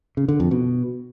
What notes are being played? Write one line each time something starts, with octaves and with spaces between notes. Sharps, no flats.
C#3
D3
F2
B2